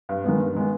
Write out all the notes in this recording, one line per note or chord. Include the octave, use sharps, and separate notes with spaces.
G2
D#3 G#3 B3
G2
D#3 G#3 B3